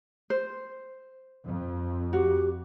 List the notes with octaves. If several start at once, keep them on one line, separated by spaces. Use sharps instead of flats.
C5
F2
F#4 G4